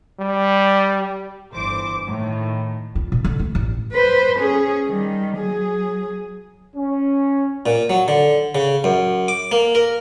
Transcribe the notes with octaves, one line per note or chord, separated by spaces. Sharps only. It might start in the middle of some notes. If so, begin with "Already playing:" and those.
G3
G1 E3 C5 D6
A2 D#3
F4
A#2
D3
A3
A1
B4 C5
C#4 G#4
D#3 G3
F#3 G#4
C#4
A#2
F#3
D3
C#3
F#2
D6
A#3
A#4